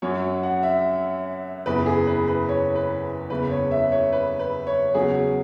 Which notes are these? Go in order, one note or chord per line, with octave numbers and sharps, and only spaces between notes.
F#2 F#3 C#4 C#5
F#5
E5
F#1 E2 E3 B4
G#4
B4
B4
C#5
B4
F#1 E2 C#3 B4
C#5
E5
C#5
B4
B4
C#5
E2 C#3 F#3 G#4